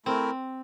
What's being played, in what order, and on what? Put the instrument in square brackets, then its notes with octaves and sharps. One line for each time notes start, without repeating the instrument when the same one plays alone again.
[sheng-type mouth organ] A3 E4 A#4 [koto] C4